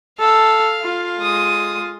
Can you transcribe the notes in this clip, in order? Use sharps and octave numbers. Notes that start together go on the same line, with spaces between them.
A4 F5
F4
G#3 D#6